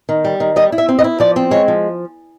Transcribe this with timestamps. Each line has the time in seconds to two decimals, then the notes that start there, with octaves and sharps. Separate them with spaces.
0.09 D#3
0.25 G3
0.40 D#3
0.56 G3 D#5
0.72 E4
0.78 E5
0.89 C4
0.99 D#5
1.04 E4
1.20 F3 D5
1.36 C4
1.51 G#3 C#5
1.68 F3